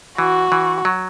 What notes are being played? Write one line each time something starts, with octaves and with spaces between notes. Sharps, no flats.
E3 F#4
E3
F#3